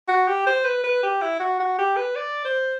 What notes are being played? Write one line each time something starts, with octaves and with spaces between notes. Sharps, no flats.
F#4
G4
C5
B4
B4
G4
E4
F#4
F#4
G4
B4
D5
C5